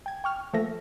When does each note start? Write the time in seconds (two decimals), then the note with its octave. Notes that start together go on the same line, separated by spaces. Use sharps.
0.06 G5 G#6
0.24 G5 C#6 F6
0.53 F3 A3 A#3 A4 E5 A#6